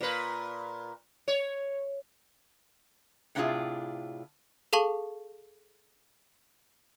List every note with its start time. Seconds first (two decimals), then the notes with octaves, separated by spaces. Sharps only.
0.01 A#2 B4
1.28 C#5
3.35 A2 C3 D4 E4 F4 G#4
4.73 G#4 A4 F5 A5 C#6 F#7